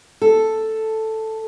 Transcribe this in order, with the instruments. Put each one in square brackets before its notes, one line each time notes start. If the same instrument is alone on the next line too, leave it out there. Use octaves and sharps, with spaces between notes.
[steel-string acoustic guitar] A4